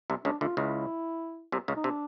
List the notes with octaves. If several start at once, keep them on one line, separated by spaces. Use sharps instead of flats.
C2 C3
C#2 C#3 D4
D2 D3 F4
C#2 C#3 E4
C2 C3
C#2 C#3
D#4
C3 D4